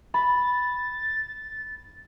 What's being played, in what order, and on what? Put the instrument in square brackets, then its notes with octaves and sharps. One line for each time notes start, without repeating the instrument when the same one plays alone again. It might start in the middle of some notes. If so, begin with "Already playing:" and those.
[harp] B5 [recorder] A6